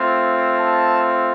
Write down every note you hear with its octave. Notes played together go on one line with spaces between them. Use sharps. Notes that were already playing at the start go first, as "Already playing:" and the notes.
Already playing: A3 C4 F4
A5